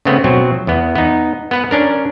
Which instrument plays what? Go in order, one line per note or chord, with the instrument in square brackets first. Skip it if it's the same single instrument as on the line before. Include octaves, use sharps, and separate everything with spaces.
[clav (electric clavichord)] C#3 A3 B3 C4
B2 F#3 C4
E2 B3
B3 D#4
B3 B4 F#5
C#4 D4 A#4